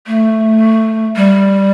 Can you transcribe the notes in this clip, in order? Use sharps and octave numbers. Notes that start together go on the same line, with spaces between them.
A3
G3